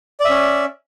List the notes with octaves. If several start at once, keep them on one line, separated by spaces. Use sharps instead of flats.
C#4 D5 E5